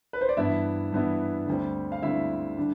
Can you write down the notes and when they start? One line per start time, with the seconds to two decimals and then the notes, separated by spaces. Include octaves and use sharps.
0.13 B4
0.21 C5
0.29 D5
0.37 G2 E3 B3 E4 E5
0.92 G2 E3 B3 E4
1.47 D2 D3 G3 C4
1.92 F5
2.02 D2 D3 G3 C4 E4 E5
2.58 D3 G3 D4